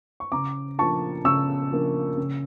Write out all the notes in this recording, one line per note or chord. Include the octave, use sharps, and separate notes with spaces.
C#6
C#3 A#5 D6
F3 A#3 D4 A5 C#6
C#3 C#6 E6
F3 A#3 D4
C#3